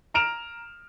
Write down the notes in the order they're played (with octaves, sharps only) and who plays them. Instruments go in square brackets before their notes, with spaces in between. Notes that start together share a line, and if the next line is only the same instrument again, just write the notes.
[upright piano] A#5 F6 D7 E7 F7